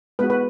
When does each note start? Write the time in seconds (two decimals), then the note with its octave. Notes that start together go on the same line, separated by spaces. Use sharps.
0.19 G#3 B3 F#4 B4
0.30 B4